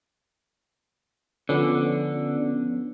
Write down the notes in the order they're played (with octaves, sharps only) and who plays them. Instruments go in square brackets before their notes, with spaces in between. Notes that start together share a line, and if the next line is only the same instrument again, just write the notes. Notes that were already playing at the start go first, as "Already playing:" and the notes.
[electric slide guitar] D3 [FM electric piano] F3 B3 C#4